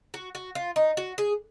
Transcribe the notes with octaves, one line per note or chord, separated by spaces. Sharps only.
F#4
F#4
F4
D#4
F#4
G#4